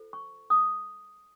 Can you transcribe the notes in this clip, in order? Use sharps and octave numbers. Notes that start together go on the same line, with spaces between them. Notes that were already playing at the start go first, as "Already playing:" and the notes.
Already playing: F4 A4 C5
C#6
D#6